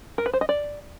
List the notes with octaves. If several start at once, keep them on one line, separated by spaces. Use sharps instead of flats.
A#4
B4
C5
D#5
D5